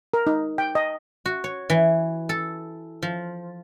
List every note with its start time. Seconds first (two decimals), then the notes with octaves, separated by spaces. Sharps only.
0.14 A#4
0.27 D#4
0.58 G5
0.75 D#5
1.26 F#4
1.44 C#5
1.70 E3
2.29 A4
3.02 F3